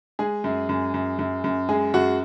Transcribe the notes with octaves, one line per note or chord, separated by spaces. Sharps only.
G#3 G#4
F#2
F#2
F#2
F#2
F#2
G#3 G#4
F#2 F#4